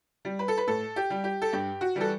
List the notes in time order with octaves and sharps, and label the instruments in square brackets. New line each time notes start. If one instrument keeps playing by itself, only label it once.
[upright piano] G3
B4
A4
B4
A2 A4
G4
G3
G4
A4
G2 G4
F#4
E3 G3 A4